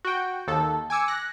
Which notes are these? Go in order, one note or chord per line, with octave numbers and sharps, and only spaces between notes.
F#4 G5
D#2 A4
G#5 D6 E6 C#7
F#6 A#6